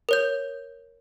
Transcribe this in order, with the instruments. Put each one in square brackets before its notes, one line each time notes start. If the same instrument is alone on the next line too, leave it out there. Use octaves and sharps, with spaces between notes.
[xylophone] A#4 C#5 G6